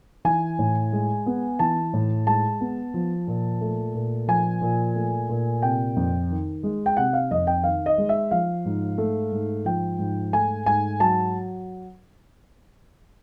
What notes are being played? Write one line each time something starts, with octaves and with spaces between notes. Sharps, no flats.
E3 G#5
A2
G#3
B3
E3 A5
A2
G#3 A5
B3
F3
A#2
A3
A#2
F3 G#5
A#2
A3
A#2
C3 G5
F2
D#3
G#3
G5
C3 F#5
F5
F2 D#5
G5
D#3 F5
D#5
G#3
E5
F3 F5
G#2
A3
G#2
F3 G5
G#2
A3 G#5
G#2 G#5
F#3 A5